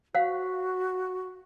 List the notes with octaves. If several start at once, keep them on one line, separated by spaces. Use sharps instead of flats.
F#4 C5 F5 F#5